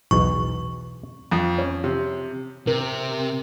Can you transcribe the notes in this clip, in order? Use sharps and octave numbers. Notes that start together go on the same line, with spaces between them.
B1 E2 B2 C#6
F2
C#4
C3
C3 A#4